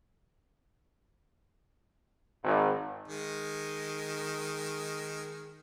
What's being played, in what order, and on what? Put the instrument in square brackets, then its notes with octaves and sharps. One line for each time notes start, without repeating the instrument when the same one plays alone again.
[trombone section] G#1
[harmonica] D#3 G#3